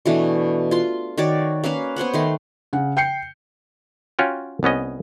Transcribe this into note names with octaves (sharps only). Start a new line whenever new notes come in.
B2 E3 A3 D4
F4 C6
D#3 F#4 C#5 D5
A#3 C#4 B4 F5
B3 C5 C#5 F#5
D#3 A3 C6
C#3 F#5
G5 G6 C7 C#7
C#4 F4 F#4 G5
C2 B3 C#4 D#5